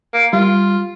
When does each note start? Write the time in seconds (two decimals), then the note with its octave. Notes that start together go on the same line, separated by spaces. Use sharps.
0.14 A#3
0.33 G3 F4